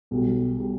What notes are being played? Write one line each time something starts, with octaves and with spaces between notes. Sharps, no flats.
B1 B2 G3
B2 G3